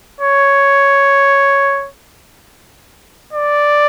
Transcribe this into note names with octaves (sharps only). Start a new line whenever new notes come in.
C#5
D5